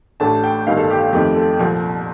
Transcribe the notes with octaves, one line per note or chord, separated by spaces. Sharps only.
A1 A2 A3 D4 A5
G5
G1 G2 D#3 A#3 F5
A4
G4
G4
F2 D#3 A3 C4 G4
A4
C2 A#2 F3